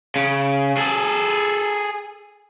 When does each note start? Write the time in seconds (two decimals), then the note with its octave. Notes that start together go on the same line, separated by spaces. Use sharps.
0.16 C#3
0.77 G#4 A4